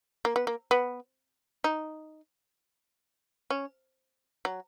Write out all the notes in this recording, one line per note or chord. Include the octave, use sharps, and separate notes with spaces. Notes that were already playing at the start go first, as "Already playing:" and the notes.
A#3
B3
A#3
B3
D#4
C#4
F#3